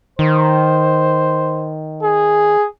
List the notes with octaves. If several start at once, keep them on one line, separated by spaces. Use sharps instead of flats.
D#3 C5
G#4